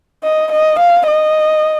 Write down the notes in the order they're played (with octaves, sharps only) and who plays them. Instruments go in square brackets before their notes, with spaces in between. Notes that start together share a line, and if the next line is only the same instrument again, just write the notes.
[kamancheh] D#5
D#5
F5
D#5